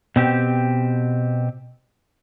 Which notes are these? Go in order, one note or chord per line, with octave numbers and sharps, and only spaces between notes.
B2 C4 G4